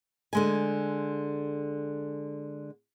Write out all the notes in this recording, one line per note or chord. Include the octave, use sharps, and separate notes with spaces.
D3 G#3 G#5